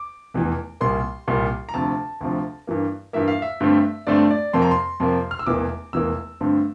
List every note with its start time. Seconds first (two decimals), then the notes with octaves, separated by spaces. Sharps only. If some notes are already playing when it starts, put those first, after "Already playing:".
Already playing: D6
0.34 F1 E2 E3
0.81 C2 A#2 G3 A#3 C6
1.27 C2 A#2 G3 A#3
1.69 A#5
1.74 D2 C3 F3 A5
2.21 D2 C3 F3
2.67 G2 E3 A#3
3.13 G2 E3 A#3 E5
3.28 F5
3.42 E5
3.61 G2 D3 A3 C4
4.07 G2 D3 A3 C4 D5
4.30 D5
4.53 F2 C3 F3 A#3 C6
4.62 A#5
4.71 C6
5.00 F2 C3 F3 A#3
5.31 F6
5.39 E6
5.46 F1 E2 E3 A#3 D6
5.93 F1 E2 E3 A#3 E6
6.41 G2 D3 A3 C4